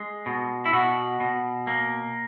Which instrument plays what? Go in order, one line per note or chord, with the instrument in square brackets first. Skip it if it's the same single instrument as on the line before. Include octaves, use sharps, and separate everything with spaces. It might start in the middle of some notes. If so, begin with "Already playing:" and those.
Already playing: [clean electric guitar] G#3
B2
E4
B2 F#4
B2
A#3